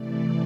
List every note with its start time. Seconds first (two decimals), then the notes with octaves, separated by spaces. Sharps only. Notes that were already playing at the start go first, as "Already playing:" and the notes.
Already playing: C3 E3 A3 D5